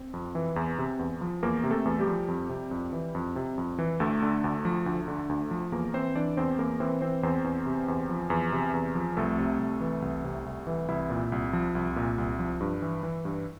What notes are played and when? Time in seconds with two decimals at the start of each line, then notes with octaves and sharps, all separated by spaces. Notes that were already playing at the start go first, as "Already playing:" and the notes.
Already playing: C4
0.14 F2
0.35 E3
0.56 E2
0.78 C3
0.99 E2
1.21 F3
1.43 E2 A#3 A#4
1.64 C3
1.71 A3 A4
1.85 E2
1.99 G3 G4
2.07 F3
2.28 F2
2.49 C3
2.71 F2
2.93 E3
3.15 F2
3.36 C3
3.58 F2
3.78 E3
4.00 D2 A3 A4
4.22 D3
4.44 D2
4.65 F3
4.86 D2
5.08 D3
5.29 D2
5.51 F3
5.72 E2 A#3 A#4
5.94 E3 C4 C5
6.15 E3 D4 D5
6.37 E2 C4 C5
6.59 E2 A#3 A#4
6.80 E3 C4 C5
7.01 E3 C4 C5
7.23 E2 C4 C5
7.44 E2
7.66 C3
7.88 E2
8.09 F3
8.30 E2
8.52 C3
8.74 E2
8.95 F3
9.17 C2 A3 A4
9.38 C3
9.59 C2
9.81 E3
10.02 C2
10.24 C3
10.46 C2
10.67 E3
10.88 C2 E4
11.10 A#2
11.32 C2
11.53 F3
11.75 C2
11.96 A#2
12.18 C2
12.39 F3
12.60 G2
12.82 E3
13.03 E3
13.25 G2